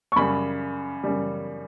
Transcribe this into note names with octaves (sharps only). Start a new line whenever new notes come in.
C#6
F#2 C#3 G3 B5
F#2 C#3 G3